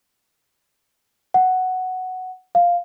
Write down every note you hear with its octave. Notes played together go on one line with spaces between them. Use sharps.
F#5
F5